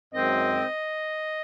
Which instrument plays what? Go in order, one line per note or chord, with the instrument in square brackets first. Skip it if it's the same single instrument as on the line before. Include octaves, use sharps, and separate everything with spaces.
[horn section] F#2 D#3 G#3 C4 [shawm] D#5